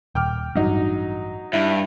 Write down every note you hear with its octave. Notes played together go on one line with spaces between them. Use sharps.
D#1 G5 D6 F6
A1 G2 F#3 D#4
G2 E4